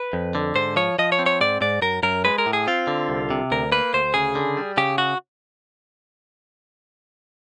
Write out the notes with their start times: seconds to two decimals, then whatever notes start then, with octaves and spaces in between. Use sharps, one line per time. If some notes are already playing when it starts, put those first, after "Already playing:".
Already playing: B4
0.13 F2
0.35 D3
0.55 G#2 C5
0.76 F3 C#5
0.99 F3 D#5
1.12 C#5
1.19 C4
1.26 C#5
1.41 G#2 D5
1.61 G#2 D5
1.82 F#2 A#4
2.03 F#2 A#4
2.25 G#3 B4
2.38 A#4
2.46 A2
2.53 G#4
2.67 C4 F4
2.87 D3
3.09 C2
3.30 C3
3.51 D2 A#4
3.72 A#3 B4
3.94 D2 C5
4.14 C#3 G#4
4.35 D3
4.57 G3
4.77 C#3 G4
4.98 F#4